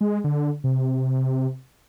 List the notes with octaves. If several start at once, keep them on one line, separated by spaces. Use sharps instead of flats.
G#3
D3
C3